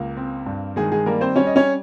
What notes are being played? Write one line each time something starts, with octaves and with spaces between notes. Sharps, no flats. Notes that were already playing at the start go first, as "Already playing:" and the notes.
Already playing: C#2 A#3
C4
G2
D#3 G#3 G#4
G#3 G#4
G3 A#3 A#4
C4 C5
G3 C#4 C#5
D#5
C#4 C#5